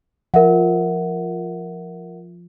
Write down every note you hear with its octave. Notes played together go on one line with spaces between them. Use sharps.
F3 A#4 E5 F#5